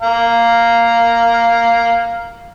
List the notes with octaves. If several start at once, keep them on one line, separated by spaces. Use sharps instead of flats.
F5 A#5